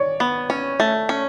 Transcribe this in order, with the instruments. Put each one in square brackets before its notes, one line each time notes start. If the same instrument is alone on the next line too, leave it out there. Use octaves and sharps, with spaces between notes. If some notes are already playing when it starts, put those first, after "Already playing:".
Already playing: [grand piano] C#5 D5
[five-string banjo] B3
C#4
A3
C#4